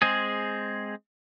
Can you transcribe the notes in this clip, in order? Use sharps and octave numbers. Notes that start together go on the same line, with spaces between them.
G#3 C4 G#4